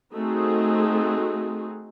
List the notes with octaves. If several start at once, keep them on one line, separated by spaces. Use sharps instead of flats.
A3 C4 D#4 F#4 G#4